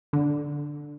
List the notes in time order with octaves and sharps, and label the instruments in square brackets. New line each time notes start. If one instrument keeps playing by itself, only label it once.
[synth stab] D3